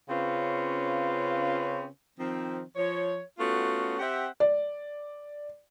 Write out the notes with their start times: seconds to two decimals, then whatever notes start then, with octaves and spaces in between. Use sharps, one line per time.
0.09 C#3 C4 C#4 F4 B4
2.18 D#3 F3 C4
2.76 F3 C#5
3.39 A3 B3 C#4 F4 F#4
3.99 C4 G4 E5 F#5
4.40 D5